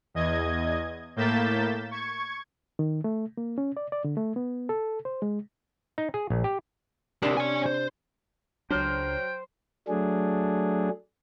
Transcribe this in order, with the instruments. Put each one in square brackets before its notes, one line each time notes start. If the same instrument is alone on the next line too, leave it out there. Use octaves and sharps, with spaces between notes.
[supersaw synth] E2 D#5 G#6
A2 A#3 G6 A6 B6 E7
C#6 G#6
[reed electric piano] D#3
A3
A#3
C#4
D5
D5
D3
A3
B3
A4
C5
G#3
[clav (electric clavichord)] D#4
G#4
A#1
G4
[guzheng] C3 D4 [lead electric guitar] G4 A#4
[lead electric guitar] C#5 G#5
C5
[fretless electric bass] C#2 D4 [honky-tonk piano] F#3 F6 [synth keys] C5 [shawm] G5
[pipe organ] F#3 A3 D4 G#4